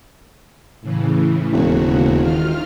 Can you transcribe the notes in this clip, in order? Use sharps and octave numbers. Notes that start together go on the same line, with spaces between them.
A2 C#3 E3
E1 D#2 C#3 F#4
D#3 F4 F6